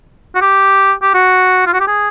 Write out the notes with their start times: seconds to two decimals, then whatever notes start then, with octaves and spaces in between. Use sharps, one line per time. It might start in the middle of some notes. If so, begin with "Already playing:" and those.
0.35 F#4
0.41 G4
1.02 G4
1.14 F#4
1.67 F4
1.73 F#4
1.80 G4
1.87 G#4